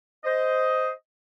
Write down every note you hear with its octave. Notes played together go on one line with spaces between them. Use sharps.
C5 D#5